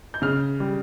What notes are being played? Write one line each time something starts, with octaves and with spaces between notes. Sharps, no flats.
G6
C#3 F6
G3